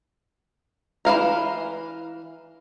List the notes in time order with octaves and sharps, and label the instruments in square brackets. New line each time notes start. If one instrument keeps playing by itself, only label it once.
[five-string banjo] E3 D#4 F5 A#5